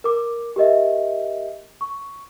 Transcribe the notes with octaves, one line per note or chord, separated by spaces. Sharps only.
A#4 D6
G4 A#4 D#5 E5
C#6